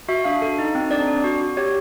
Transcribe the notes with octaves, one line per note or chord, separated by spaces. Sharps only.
F#4 E5
D4 F5
A4
D#4
C4
D4 D5
D4
F#4
F#4
G4 C#5